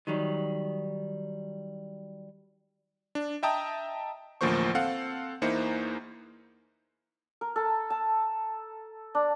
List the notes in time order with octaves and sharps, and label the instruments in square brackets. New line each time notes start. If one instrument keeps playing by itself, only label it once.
[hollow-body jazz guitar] D#3 F#3 G3
[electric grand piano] D4
D#5 E5 G5 A5 A#5 D#6
A1 D2 F3 A#3 C5 C#6
C4 A4 F5 F#5
E2 A#3 D#4 E4 C5 C#7
[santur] A#4
A4
A5
D4